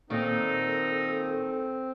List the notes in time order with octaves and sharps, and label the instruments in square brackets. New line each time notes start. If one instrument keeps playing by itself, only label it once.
[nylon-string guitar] A#2 D#3 [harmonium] C4 [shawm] D#4 [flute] A4